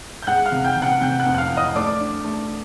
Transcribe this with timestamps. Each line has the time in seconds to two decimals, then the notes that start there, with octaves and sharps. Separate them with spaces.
0.23 G6
0.27 G#3 F#5 F#6
0.46 F5 F6
0.52 C3
0.64 G5 G6
0.76 C3
0.82 F#5 F#6
1.01 C3 G5 G6
1.19 F#5 F#6
1.26 F2
1.34 F#6
1.38 F5 F6
1.51 E3
1.57 D#5 D#6
1.75 A3 D5 D6
2.00 D4
2.25 A3